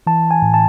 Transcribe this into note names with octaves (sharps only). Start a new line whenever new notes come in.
E3 A5
G#5
A2
A5